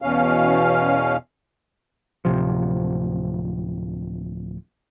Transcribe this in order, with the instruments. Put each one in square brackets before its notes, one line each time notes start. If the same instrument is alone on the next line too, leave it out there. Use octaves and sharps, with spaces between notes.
[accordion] E2 B2 C#4 F5
[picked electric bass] D1 C3 F3